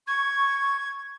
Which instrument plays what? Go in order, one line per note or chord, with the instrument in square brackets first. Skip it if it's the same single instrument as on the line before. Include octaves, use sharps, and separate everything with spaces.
[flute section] C#6 [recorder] G#6